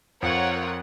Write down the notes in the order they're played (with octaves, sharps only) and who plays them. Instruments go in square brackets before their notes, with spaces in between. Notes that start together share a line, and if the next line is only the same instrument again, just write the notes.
[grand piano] F2 [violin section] F4 A#4 C#5 F#5